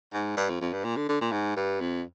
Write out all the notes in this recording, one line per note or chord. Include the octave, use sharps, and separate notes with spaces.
G#2
G2
F2
F2
G2
A#2
D3
D3
A#2
G#2
G2
F2